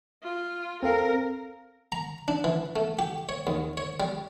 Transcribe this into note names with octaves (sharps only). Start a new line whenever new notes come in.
F4
C4 A4 A#4 F5
A#5
D4
E3
A3
G4
C#5
D#2
C#5
G3